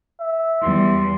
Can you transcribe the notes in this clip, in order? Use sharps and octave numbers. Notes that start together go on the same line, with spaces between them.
E5
E2 G3 C6